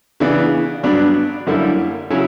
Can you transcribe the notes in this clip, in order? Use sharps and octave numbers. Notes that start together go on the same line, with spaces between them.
C#3 E3 B3 D4
G2 F#3 B3 D4
F#2 D3 G3 A#3 E4
C#3 F#3 C#4 E4